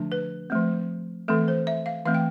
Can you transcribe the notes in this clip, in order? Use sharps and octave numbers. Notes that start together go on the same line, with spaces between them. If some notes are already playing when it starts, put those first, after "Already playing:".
Already playing: D3 F3 A3 D4
B4
F3 A3 C4
E3 A3 C4 A4
C5
E5
F5
E3 A3 C4 F5
G5